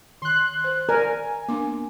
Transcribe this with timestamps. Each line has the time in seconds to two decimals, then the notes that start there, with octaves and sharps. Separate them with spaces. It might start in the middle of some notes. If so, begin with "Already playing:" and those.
0.22 D#3 C6 F#6
0.64 C5
0.89 A#4 D5 G#5 A#5
1.49 A#3 B3 D4 D6